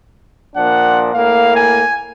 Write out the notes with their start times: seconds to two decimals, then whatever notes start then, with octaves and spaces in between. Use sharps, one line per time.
0.56 A#2 F3 D4 F#5
1.14 A2 A#3 F5
1.56 G#5